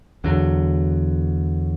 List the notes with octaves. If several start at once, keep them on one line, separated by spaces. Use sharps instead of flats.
E2 D3 F#3